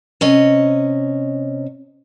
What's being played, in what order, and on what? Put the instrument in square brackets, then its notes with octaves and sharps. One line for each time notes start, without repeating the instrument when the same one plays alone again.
[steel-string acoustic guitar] C3 C#4 D#5